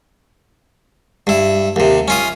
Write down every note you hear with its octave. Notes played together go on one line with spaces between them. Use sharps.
G2 E4
D#2 C3
C#4 F4 D#6